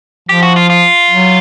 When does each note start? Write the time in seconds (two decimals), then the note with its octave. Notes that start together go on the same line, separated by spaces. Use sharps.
0.29 F3 G4
0.43 F#4
0.56 F4
0.70 F4
1.11 F#3